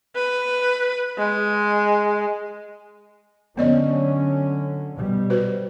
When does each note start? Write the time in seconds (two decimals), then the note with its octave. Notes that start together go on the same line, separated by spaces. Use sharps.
0.16 B4
1.17 G#3
3.57 D3 F#3 B3 C#4 D5 D#5
4.94 B2 G3
5.30 F#4 B4 C5